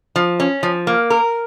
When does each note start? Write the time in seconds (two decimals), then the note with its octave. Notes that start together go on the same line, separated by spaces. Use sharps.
0.16 F3
0.40 C#4
0.63 F3
0.87 A#3
1.10 A#4